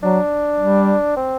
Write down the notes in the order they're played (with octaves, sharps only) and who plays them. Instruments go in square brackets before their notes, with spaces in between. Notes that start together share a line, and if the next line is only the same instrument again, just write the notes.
[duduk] F#3 [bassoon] D4
[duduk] G3
[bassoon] C4